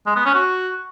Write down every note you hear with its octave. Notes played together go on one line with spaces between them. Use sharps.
G#3
B3
C#4
F#4